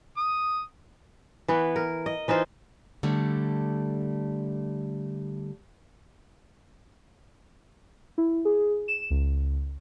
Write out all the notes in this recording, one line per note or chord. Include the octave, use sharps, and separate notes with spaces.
D#6
E3 B3
A#4
D#5
E3 D#4 F4 C5
D3 G3 A3
E4
G#4
E7
C#2